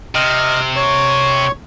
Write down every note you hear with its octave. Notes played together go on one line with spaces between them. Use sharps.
C3 D#5 F6
C#5 C#6